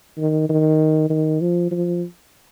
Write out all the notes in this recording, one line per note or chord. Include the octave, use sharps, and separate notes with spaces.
D#3
D#3
D#3
F3
F3